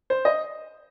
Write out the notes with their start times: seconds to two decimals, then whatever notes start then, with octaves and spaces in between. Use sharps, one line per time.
0.10 C5
0.25 D#5